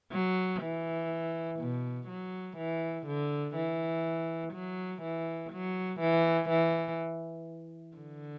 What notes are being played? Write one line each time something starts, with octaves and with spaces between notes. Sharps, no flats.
F#3
E3
B2
F#3
E3
D3
E3
F#3
E3
F#3
E3
E3
D3